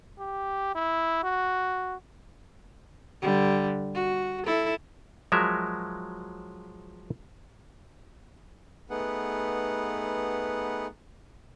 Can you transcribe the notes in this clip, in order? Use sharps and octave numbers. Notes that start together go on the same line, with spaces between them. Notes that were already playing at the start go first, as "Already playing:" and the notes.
G4
E4
F#4
D3 G3
F#4
E4 A4
F3 F#3 G#3 A#4 E5
A3 B3 D#4 G#4 B4 F#5